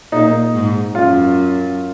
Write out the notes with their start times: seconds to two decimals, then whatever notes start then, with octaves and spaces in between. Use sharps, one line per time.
0.12 A#2 D#4
0.54 G#2
0.95 F#2 F4